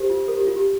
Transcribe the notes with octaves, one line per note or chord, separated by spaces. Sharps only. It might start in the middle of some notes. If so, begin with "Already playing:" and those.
Already playing: G4 A#4 C5
F4
A#4
G4
F4
G4